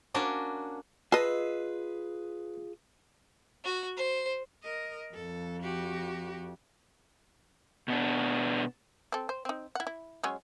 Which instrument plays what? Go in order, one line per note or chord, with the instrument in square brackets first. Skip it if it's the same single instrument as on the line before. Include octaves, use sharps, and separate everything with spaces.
[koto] A#3 C#4 D4 F#4
[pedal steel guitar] F4 G#4 E6 [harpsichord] B4 [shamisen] D#5 A5
[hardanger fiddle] F#4
C5
[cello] A#4 D#5
[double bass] F2 [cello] A4
[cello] F#4 G4
[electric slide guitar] B2 B3 D4
[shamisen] C4 A4
C5
C4 D#4
E4 F#5
E4
F#3 G#3 C#4